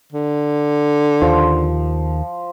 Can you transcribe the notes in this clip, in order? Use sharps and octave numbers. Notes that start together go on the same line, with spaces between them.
D3
D#2 F3